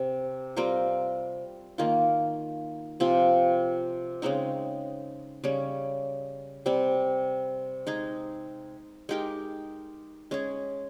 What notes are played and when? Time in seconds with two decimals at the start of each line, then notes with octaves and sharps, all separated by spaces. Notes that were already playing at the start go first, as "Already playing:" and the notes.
Already playing: C3
0.56 G3 C4 F4 A#4
1.78 D#3 A#3 F4
3.00 C3 F3 C4 F4
4.22 C#3 G#3 C4 D#4
5.44 C#3 G3 C#4
6.66 C3 G3 C4
7.87 G#3 D#4 G#4
9.09 G#3 D#4 G4 A#4
10.31 G#3 C#4 G#4